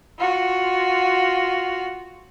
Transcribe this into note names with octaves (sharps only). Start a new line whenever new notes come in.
F4 F#4